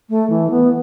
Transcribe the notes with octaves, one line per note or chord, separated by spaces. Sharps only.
A3
E3
B3